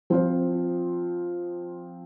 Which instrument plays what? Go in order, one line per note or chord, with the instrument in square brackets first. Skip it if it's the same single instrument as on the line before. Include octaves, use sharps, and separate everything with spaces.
[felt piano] F3 C4 F4 C5